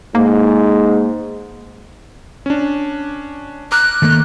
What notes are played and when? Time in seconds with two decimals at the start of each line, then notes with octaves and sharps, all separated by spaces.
0.15 G#2 A#3
2.46 C#4 D4
3.72 A#5 D6 F6 F#6
4.02 D#3 A3 A#3